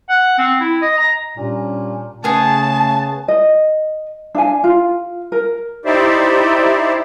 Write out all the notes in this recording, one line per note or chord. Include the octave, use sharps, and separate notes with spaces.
F#5
C4
E4
D#5
A#5
A#2 G3 C#4 D4
C#3 A3 B3 G#4 A5
D#5
D4 F5 G#5
F4
A#4
D#4 E4 G4 C5 D5 E5